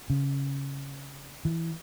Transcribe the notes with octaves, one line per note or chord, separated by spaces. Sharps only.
C#3
E3